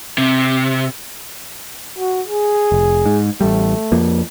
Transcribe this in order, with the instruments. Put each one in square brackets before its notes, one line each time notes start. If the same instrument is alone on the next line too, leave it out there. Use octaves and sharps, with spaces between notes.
[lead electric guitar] C3
[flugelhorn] F#4
G#4
[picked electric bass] F1
G#2
[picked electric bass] A1 G3 [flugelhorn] A3
[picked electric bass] F2 F3 A#3